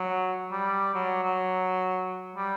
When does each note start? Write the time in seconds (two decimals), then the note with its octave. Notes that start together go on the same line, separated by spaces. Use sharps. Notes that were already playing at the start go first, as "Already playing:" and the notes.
Already playing: F#3
0.52 G3
0.95 F#3
1.23 F#3
2.36 G3